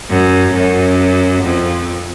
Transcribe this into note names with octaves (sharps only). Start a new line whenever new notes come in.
F#2
F#2
F2